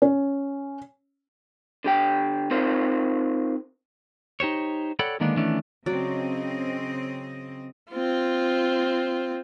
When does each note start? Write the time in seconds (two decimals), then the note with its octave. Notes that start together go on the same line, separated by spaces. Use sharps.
0.02 C#4
1.84 D3 G4 G5
2.51 C4 D#4 F4 A#4 C5
4.40 D#4 G4 C5 C#5
4.99 A4 C#5 D5 F#5 G5 B5
5.20 D3 D#3 G#3 A#3 B3 D4
5.37 D#3 E3 A3 B3 C#4 D4
5.86 C#3 F#3 C4 D5 D#5
7.92 C4 F4